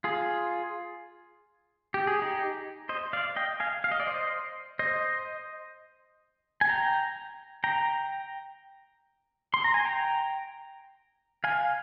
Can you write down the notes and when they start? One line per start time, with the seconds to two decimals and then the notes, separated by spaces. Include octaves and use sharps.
0.04 F4 G#4
1.94 G4
2.07 G#4
2.22 D#4 G4
2.89 C5 D#5
3.13 D5 F5
3.36 D#5 G5
3.60 F5 G#5
3.84 F5
3.91 D#5
4.00 D5
4.07 C5 D#5
4.79 C5 D#5
6.61 G#5
6.69 G5 A#5
7.64 G5 A#5
9.54 C6
9.64 A#5
9.74 G#5
9.85 G5 A#5
11.44 F5 G#5